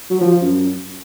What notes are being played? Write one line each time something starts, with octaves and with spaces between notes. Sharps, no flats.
F#3
F3
F3
F#2